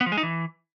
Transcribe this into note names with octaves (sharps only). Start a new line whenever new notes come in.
B3
F3
G#3
D#4
E3